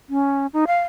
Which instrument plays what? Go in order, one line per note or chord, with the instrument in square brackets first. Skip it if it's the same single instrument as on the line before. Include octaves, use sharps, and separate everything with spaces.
[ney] C#4
D#4
F5